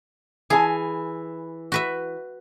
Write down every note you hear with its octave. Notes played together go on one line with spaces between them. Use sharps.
E3 G#4 G#5
F#4 B4 E5